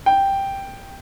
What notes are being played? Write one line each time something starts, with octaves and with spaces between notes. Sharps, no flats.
G5